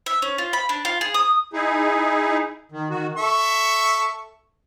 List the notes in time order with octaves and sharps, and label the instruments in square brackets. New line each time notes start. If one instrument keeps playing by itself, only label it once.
[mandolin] E5
C#4
F4
B5
D4
F4
G#4
D#6
[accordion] D#4 E4 G#4
D#3
D#3 F#4
[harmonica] A4 E5 C#6